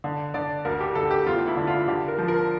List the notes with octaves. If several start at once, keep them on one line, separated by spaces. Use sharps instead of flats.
D3
D3 D5
D2 A#4
G4
D2 A4
G4
E2 F4
E4
D3
F4
D3 G4
A#4
F3
A#4